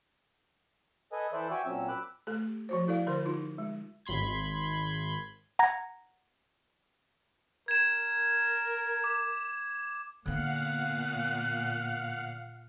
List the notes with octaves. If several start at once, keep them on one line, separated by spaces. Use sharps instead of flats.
A4 B4 D#5 G#5
E3 A4 B4 C5 D5 E5
F#4 E5 G5 G#5 C#6 D6
A#2 F#3 C4 C#4 E6
B5 D6 E6 F#6
A3 G4 A4
F3 F#4 C5
E4 A4 D5 F5
D3 G4 A#4 C5 C6
D#4 F4
G#3
G#1 B5 C6 G#6
F#5 A#5 G#6 A#6
A#4 G#6 E7
D6
A#2 D3 B3 F5 F#5 F#6